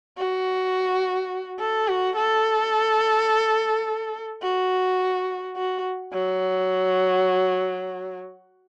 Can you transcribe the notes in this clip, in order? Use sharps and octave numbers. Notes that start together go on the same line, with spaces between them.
F#4
A4
F#4
A4
F#4
F#4
F#3